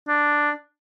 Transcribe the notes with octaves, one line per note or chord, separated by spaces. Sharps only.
D4